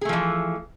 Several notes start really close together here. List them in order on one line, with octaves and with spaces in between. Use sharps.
G#4 A3 F3 E3